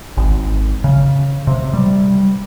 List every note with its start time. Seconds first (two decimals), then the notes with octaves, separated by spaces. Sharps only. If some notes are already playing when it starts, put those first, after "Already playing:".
0.17 G#1
0.84 C#3
1.47 C3
1.73 G3